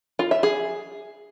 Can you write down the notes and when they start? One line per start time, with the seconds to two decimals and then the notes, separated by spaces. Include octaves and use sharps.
0.19 F4
0.31 E5
0.43 G#4